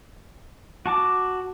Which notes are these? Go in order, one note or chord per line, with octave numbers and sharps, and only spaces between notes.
F#4 A5 D6